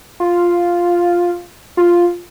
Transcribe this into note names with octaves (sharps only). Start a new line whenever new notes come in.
F4
F4